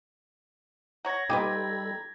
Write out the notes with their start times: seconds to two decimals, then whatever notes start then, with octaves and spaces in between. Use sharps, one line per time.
1.05 C#5 F#5 A#5 G#6 A#6
1.30 G3 D#4 F4 G4 A4 B4 B5